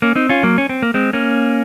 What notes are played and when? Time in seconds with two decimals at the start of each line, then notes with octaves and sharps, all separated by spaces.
0.02 A#3 C#4
0.15 C4 D#4
0.29 C#4 F4
0.43 F#3 A#3
0.58 C#4
0.69 C4
0.82 A#3
0.94 G#3 C4
1.13 A#3 C#4